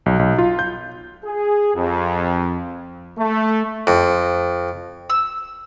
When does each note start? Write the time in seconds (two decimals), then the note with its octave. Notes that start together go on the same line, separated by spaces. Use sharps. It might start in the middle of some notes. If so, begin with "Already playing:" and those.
0.06 B1
0.19 B1
0.38 F4
0.59 G6
1.25 G#4
1.75 F2
3.17 A3
3.87 F2
5.10 E6